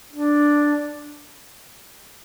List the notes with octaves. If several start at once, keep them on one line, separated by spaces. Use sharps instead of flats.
D4